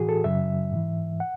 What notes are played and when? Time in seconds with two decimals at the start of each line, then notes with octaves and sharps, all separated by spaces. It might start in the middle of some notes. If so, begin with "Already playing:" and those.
Already playing: A2 E3 F#4 G#4
0.09 A4
0.24 F#2 C#3 F#3 E5
0.72 G#2 E3
1.20 F#5